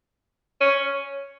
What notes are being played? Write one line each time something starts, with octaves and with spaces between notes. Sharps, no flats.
C#4